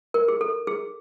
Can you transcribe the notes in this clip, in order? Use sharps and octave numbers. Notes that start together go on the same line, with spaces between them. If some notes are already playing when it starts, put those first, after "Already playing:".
A#4
G#4
A4
G#4